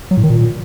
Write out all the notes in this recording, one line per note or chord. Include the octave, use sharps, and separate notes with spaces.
F#3
A2
D#3
A#2